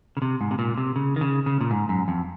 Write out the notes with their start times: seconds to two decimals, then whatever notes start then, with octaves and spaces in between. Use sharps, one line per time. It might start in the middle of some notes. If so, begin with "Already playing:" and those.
0.17 C#3
0.22 C3
0.41 G#2
0.51 C3
0.59 A#2
0.78 C3
0.96 C#3
1.16 D#3
1.21 C#3
1.46 C#3
1.61 A#2
1.71 G#2
1.89 F#2
2.08 F2